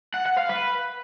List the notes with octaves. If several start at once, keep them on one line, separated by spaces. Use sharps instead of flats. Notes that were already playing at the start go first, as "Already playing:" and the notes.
F#5
F#5
F5
B4